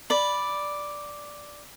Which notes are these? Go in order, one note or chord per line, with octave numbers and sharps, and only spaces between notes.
D5 B5